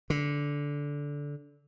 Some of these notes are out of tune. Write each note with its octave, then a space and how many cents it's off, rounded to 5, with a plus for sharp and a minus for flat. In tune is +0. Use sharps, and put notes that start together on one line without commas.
D3 -15